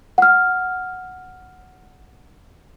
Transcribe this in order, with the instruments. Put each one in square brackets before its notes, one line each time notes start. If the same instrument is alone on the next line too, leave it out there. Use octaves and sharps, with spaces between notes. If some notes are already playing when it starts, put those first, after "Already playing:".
[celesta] F#5 F6